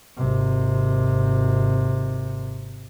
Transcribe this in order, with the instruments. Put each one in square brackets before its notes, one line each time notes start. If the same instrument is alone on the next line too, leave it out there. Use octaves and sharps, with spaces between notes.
[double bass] G#1 C3